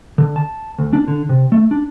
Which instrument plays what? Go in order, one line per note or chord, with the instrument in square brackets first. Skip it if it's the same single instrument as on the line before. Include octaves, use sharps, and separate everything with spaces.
[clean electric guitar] D3
A5
D2
D4
D3
C3
A3
D4